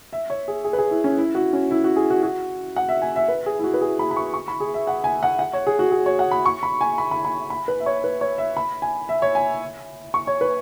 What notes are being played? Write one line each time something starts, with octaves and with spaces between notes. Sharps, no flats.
E5
C#5
G#4
G#4
B4
G#4
E4
C#4
E4
F#4
C#4
E4
F#4
G#4
F#4
F#4
F#5
E5
G#5
E5
B4
G#4
E4
F#4
B4
G#4
B5
B5
C#6
C#6
B5
G#4
E5
F#5
G#5
F#5
F#5
C#5
G#4
F#4
G#4
C#5
F#5
B5
C#6
B5
G#5
B5
B5
B5
B5
B4
E5
C#5
B4
C#5
E5
B5
G#5
E5
C#5
G#5
C#6
C#5
B4